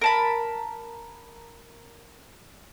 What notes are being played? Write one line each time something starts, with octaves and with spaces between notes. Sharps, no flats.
A#4 A5 B5